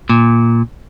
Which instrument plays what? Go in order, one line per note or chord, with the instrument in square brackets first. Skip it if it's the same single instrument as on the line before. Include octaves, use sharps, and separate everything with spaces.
[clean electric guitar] A#2